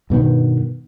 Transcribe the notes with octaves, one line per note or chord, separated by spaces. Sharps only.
G2 B2 D#3 B3